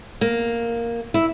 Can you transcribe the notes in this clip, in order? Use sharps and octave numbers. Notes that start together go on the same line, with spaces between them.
A#3
E4